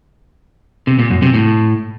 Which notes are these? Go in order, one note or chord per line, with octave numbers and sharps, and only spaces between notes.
C3
A#2
F#2
C3
A2